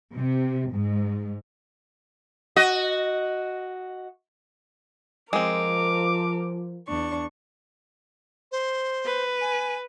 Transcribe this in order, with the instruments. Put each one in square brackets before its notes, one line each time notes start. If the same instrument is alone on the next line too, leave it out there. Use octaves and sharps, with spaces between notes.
[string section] C3
G#2
[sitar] F#4 D#5
[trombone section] F3 [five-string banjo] G#3 C4 [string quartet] A#4 [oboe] D6
[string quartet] E2 D4 C#6
[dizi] C5
[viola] B4
[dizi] G#5